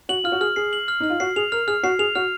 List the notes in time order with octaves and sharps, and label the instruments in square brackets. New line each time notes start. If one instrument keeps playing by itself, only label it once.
[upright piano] F#4 [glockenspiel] F#7
[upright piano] F4 [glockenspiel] F6
[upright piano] F#4
[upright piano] G#4 [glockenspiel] F6
[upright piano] G#4 [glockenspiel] C7
[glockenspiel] F#7
F6
[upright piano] D#4 [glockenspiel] F6
[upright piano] F4
[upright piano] F#4 [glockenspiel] C7
[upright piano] G#4 [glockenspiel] F7
[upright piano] A#4 [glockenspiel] F6
[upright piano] G#4 [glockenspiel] F6
[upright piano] F#4 [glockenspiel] C7
[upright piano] G#4 [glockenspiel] F7
[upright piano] F#4 [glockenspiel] F6